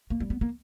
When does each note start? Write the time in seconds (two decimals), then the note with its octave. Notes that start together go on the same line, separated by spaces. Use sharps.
0.10 A#3
0.20 G3
0.30 B3
0.41 A#3